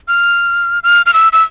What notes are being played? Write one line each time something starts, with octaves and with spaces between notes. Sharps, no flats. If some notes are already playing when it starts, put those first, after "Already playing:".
F6
F6
F6
E6
E6